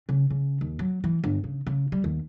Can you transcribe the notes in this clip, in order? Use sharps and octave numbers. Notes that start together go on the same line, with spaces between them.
C#3
C#3
D#2
F#3
E3
G1
C#3
C#3
G3
D#2